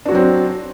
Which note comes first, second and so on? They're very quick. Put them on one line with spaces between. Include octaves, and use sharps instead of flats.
D4 F#4 F#3 C4